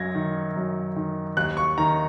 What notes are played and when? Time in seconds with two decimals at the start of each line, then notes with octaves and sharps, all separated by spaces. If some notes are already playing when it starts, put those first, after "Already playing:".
Already playing: F#2 G#6 A#6
0.15 D#3
0.56 F#2
0.96 D#3
1.37 D#2 F#6
1.57 C#6
1.78 D#3 A#5